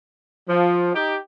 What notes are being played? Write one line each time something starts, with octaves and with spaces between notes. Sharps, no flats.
F3
D#4 G4